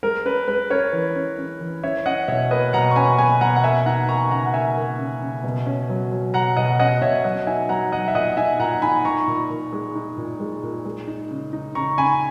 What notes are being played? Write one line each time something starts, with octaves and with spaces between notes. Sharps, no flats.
G#3 A#4
C#4 B4
G#3 B4
C#4 A#4 C#5
E3
C#4
C#4
E3
C#4 C#5 E5
C#4 D#5 F#5
B2 C#5 E5
A#3 B4 D#5
B2 F#5 A#5
C#6
C#4 G#5 B5
B2 G#5 B5
B2 F#5 A#5
F#5
A#3 E5 G#5
D#4 F#5 A#5
A#3 A#5 C#6
C#3 F#5 A#5
F#5
A#3 E5 G#5
A#3
C#3
C#3
B2
C#4
F#3
F#3
B2 F#5 A#5
B2 D#5 F#5
C#4 D#5 F#5
B2 C#5 E5
F#3 D#5 F#5
D#4 E5 G#5
F#3 F#5 A#5
F#3 D#5 F#5
E5
A#2 D#5 F#5
D#4 E5 G#5
A#2 F#5 A#5
D#4 G#5 B5
D#4 A#5 C#6
A#2
A#2
G#3
D#4
A#2
G#3
A#2
G#3
D#4
C#3
D#4
C#3 A#5 C#6
C#3 G#5 B5